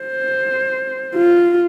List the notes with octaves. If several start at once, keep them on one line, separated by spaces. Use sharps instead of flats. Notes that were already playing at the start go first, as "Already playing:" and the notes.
Already playing: C5
F4